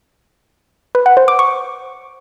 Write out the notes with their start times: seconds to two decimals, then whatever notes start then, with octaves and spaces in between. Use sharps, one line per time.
0.95 B4
1.06 F#5
1.17 C5
1.28 D6
1.39 C#6